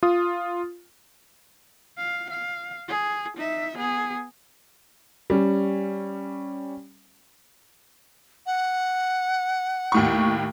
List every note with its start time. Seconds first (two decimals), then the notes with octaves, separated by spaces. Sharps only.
0.03 F4 D#6
1.97 F5
2.30 F5
2.88 G#4
3.37 D#4 E5
3.76 B3 G#4
5.30 G3 C#4
8.46 F#5
9.92 D#2 A2 C#6